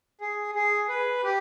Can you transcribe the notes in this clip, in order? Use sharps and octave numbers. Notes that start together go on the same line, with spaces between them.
G#4
G#4
B4
G4